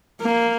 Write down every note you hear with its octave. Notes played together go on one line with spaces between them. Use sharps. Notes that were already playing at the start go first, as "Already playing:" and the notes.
A#3